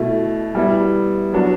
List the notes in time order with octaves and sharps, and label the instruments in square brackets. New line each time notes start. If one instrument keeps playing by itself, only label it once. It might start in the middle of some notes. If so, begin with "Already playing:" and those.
Already playing: [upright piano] B2 A3 E4
G3 B3 E4
F#3 B3 D4 F#4